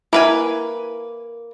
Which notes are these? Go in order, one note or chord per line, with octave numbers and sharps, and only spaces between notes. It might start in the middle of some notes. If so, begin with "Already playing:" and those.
A#3 E4 B4 G#5